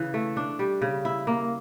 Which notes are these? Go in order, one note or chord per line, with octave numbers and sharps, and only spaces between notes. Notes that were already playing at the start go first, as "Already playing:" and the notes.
Already playing: C#3 E3
A3
D4
G3
C#3
E4
A#3